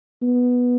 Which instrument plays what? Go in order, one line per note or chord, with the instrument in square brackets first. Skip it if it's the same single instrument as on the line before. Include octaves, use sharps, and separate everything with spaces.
[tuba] B3